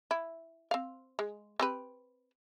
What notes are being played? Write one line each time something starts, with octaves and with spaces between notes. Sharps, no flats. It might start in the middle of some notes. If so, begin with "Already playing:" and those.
E4
C4 F5
G#3
C4 G4 B4